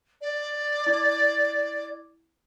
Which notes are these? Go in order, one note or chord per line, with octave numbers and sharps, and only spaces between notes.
D5
E4 D6 G#6